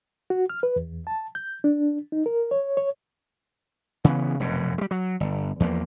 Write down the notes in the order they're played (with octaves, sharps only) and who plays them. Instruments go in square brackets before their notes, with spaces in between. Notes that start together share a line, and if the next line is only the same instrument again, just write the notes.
[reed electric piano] F#4
F6
B4
E2
A5
G6
D4
D#4
A#4
C#5
C#5
[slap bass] C#3 E3 B3
F1 F#2 B2
G3 G#3
F#3
G1
E2 F3 G#3 A#3